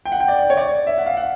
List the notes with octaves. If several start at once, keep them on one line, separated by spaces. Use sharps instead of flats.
G5
F#5
G5
D5
C#5
D5
E5
F#5
F5
F#5